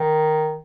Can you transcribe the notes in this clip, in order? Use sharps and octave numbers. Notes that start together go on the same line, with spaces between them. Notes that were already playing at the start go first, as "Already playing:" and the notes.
Already playing: D#3